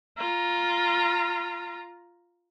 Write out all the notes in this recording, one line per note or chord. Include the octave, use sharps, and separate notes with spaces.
F4 A#5